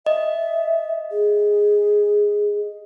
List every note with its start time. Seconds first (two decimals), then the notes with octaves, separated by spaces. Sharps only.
0.06 D#5 E5
1.11 G#4